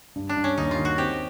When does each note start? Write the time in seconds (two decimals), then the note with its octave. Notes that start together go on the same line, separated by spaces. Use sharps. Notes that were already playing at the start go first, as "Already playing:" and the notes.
0.16 G2
0.29 D4
0.37 G2
0.44 C#4
0.57 D#2 D#4
0.71 F4
0.78 D#3
0.85 F#4
0.98 C4 G4